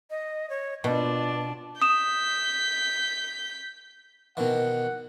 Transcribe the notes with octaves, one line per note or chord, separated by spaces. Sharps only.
D#5
C#5
B2 D4 F4 D5 A5
D#6 G6 B6 E7
B2 D#3 E3 F#5